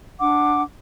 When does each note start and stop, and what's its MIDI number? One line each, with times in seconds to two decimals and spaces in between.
0.20 0.62 62
0.20 0.62 78
0.20 0.62 86